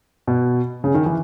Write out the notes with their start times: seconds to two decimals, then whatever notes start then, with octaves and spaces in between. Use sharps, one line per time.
0.27 B2
0.84 C#3
0.94 D#3
1.06 E3